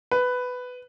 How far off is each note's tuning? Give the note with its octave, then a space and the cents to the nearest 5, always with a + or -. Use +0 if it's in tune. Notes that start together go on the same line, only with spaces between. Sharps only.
B4 +10